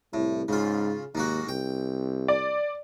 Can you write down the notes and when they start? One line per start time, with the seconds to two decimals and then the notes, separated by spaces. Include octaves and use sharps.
0.13 C2 A2
0.48 G#2 C#3 F4
1.15 D#2 G#2 A#3 F#4
1.48 C2 G5
2.28 D5